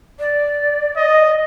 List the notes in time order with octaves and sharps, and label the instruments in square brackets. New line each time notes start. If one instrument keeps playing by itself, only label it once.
[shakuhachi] D5
[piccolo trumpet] D#5